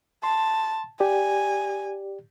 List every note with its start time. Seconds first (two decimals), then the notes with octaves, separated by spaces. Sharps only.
0.23 A5 C6
1.00 G4 D5 G#5